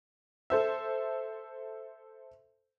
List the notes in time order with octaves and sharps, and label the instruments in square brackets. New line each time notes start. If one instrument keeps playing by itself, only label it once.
[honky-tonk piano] A4 C5 E5